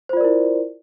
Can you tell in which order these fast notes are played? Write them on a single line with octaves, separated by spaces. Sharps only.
C5 F4 D5 A#4 E4